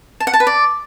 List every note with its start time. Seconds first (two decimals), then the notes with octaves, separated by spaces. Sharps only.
0.20 A5
0.27 F#5
0.34 A5
0.40 B4
0.47 D5